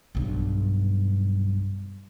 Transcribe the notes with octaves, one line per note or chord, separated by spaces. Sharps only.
B1 G2